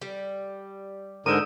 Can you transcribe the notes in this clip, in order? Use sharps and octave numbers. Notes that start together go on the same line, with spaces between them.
G3
G#2 D3 A#4 D#6 E6 G6